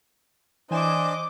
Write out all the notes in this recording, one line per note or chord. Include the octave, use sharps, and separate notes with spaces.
E3 D4 C5 D#5 G#5 D6 E7